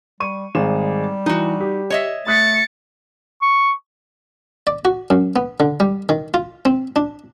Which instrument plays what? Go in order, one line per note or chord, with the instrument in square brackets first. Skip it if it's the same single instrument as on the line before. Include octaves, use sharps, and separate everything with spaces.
[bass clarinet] G3 [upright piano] C#6 D#7
[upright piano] G#1 G#3 E7 [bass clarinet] G3
[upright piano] E3 [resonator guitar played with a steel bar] D#4 F#4
[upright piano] G4
[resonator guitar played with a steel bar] C#5 D#5 E5
[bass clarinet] A3 [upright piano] D#6 F#6 B6 [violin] A6 C#7
[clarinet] C#6
[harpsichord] D5
F#4
F#2
B3
D3
G3
D#3
F4
C4
D4